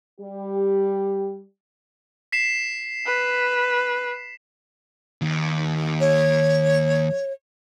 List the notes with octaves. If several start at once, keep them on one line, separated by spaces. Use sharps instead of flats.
G3 G4
B6 C7 E7
B4
D#2
C#5